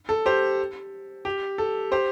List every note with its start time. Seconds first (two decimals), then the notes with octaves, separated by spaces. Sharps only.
0.09 A4
0.26 G4 C5
1.25 G4
1.58 A4
1.92 G4 C5